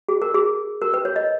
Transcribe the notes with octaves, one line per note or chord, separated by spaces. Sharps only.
G#4
A#4
G#4
A#4
B4
C#5
D#5